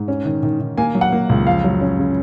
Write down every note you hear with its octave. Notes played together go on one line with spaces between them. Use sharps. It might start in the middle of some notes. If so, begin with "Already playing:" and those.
Already playing: G#2
C#4
D#3
D#3
D#3
A#3 G#5
F#3
F#5
A#3
C#2
F2 F5
F#3
C#4
C#3